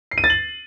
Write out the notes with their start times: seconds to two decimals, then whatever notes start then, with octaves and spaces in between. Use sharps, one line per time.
0.11 C7
0.18 D#7
0.24 A6
0.30 F#7